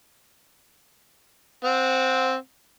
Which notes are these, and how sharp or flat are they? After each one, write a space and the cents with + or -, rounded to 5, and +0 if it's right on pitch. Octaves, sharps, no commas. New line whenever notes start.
C4 +0 F#5 -25